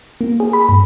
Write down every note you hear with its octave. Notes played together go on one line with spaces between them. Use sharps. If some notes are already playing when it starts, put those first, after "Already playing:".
A#3
G#4
B5
G2